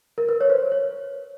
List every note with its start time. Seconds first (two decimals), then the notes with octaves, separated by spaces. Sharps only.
0.18 A#4
0.29 B4
0.41 C#5
0.50 C5
0.72 C#5